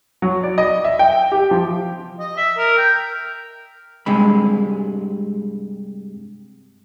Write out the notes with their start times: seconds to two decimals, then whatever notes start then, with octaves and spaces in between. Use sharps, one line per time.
0.22 F#3
0.43 D5
0.58 D#5
0.84 E5
0.99 G5
1.32 G4
1.51 F3
2.19 D#5
2.37 E5
2.57 A#4
2.78 G5
4.06 G2 C3 G#3 B5